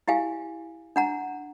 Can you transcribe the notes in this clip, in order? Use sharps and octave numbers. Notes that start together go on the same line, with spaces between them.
E4 G4 F5 G#5
D4 F#5 A#5